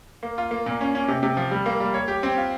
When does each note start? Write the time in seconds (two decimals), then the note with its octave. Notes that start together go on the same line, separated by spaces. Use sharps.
0.23 A#3
0.38 F4
0.51 A#3
0.66 A#2
0.81 C#4
0.95 C#4
1.08 C3
1.23 C3
1.37 F3
1.51 G3
1.66 A#3
1.80 G3
1.94 C#5
2.08 G4
2.23 C4
2.37 F4